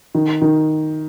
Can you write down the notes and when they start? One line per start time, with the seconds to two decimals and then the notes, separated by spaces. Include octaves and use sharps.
0.15 D#3
0.42 D#3